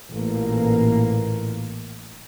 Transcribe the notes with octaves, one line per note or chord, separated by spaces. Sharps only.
A1 A#2 A#3